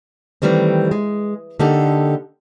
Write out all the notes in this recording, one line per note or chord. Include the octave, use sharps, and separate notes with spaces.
D#3 E3 G3 A3 C4
G#3
D3 A#3 D#4 G4 A4